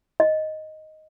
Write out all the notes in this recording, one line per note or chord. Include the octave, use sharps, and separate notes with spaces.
D#5